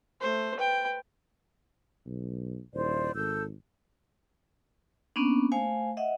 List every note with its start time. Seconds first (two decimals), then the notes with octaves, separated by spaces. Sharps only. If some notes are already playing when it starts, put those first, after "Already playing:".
0.21 A3 C5
0.57 B4 G5
2.06 B1
2.73 D#1 E4 C5 D5
3.15 G#1 A4 E6 G6
5.16 A#3 B3 C#4 D4
5.52 A3 C5 F5 G#5
5.97 D#5 E5 F#5